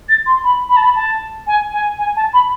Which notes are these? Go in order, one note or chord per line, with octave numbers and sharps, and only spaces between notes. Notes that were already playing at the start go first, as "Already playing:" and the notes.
A6
C6
B5
B5
A5
B5
A5
G#5
G#5
G#5
A5
B5